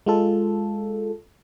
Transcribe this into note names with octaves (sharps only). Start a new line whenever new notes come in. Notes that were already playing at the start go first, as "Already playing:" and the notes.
G#3 F4 A4